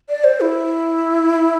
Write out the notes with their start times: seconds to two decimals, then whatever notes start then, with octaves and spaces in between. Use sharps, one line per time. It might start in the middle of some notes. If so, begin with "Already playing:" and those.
0.09 D5
0.24 C5
0.41 E4